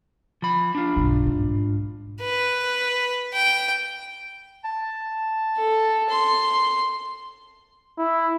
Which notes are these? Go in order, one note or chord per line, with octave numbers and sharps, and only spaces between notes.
F3 B5
D4 F4
B1 G2
G#2
B4
G5
A5
A4
C6
E4